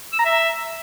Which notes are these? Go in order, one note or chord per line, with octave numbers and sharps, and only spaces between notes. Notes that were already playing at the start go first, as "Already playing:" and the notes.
E6
A#5
E5